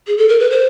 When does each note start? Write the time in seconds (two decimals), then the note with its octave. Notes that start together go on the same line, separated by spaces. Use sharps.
0.07 G#4
0.17 A4
0.29 A#4
0.40 B4
0.50 C5